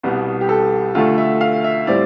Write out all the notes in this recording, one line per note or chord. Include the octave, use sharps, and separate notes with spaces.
C2 B2 G3 B3
G4
A4
D2 D3 A3 F4
E5
F5
E5
A2 G3 C4 D5